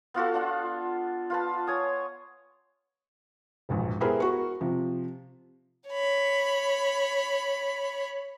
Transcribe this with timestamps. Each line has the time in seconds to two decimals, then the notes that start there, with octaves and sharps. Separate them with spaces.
0.14 B3 F4 F#4 A4
0.34 D4 F4 F#5
1.30 F4 B4 A5
1.67 C#5 G#5 D#6
3.69 E1 A#1 G#2
4.00 B3 E4 G4 G#4 A#4 C5
4.20 F#4 A#4 C#6
4.61 C3 F3
5.89 C#5 B5